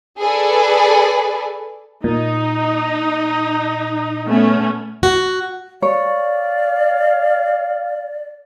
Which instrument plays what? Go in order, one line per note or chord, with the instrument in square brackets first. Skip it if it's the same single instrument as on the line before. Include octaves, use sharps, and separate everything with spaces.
[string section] G#4 A4 B4 D5
[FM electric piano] A#2 [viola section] D#4
[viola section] A3 B3 C#4
[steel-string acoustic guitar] F#4
[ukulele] C#5 [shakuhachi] D5 [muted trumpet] F5